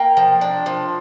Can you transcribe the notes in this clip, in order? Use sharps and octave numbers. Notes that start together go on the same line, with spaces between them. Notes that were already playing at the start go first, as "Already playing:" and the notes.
Already playing: A#3 G5 A#5
F3
D4
F3